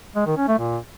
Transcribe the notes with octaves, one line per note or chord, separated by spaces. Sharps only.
G#3
D#3
C#4
A3
A#2